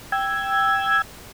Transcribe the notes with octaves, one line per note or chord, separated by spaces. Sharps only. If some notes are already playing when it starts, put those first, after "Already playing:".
G5 E6 G#6